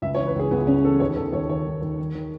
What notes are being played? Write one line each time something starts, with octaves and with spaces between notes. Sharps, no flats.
C#2 E5
C#5
E3
B4
C#2 G#4
C#2 B3
C#3 C#4
E3 A4
D#2 C#5
D#2 A4
D#2 C#5
D#3 C#5
D#2
D#2
D#3
D#3